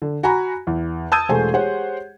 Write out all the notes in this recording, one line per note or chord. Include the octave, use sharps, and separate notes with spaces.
D3
F#4 G#5 A#5 B5
E2
A5 D#6 E6 G6 G#6 D#7
E1 A3 G#4 C5 G#5
G4 G#4 C5 C#5 F#5